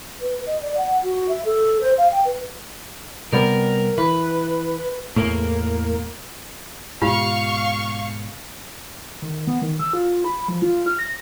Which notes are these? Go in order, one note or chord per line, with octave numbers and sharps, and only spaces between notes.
B4
D#5
D5
F#5
F#4
E5
A4
C5
F5
G5
B4
C3 G3 B3 A#4
E3 B4
E2 A2 A#3
G#2 B2 F4 G4 F5 C#6
D#3
B3
D#3
E6
F4
B5
F3
F4
F6
A#6